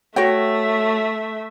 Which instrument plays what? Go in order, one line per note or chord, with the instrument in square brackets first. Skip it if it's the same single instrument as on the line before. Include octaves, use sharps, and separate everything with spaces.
[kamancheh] A3 E5 [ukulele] F#4 C#5 G5